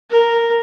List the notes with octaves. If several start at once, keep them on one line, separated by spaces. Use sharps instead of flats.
A#4